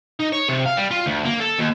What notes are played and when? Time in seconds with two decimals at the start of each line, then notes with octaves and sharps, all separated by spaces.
0.20 D#4
0.32 C#5
0.48 C3
0.66 F5
0.77 G3
0.91 F4
1.06 D2
1.25 A#3
1.40 A4
1.59 D#2